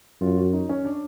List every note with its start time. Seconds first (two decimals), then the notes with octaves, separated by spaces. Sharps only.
0.21 F#2 F4
0.38 F#4
0.53 D#4
0.69 C#4
0.85 D4